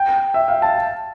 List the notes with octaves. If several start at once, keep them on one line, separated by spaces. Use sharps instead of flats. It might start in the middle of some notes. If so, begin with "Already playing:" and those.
Already playing: G5
E5
F5
A5